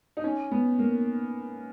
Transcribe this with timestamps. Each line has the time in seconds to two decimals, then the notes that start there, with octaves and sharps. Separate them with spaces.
0.17 D#4
0.24 C#4
0.51 B3
0.79 A#3